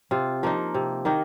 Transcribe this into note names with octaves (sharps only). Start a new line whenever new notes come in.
C3 F4
F3 A#3 D#4
C3
D#3 A#3 D#4